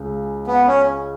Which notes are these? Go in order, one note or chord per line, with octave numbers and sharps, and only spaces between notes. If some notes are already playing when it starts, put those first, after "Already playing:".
Already playing: C#2 C#3
B3
C#4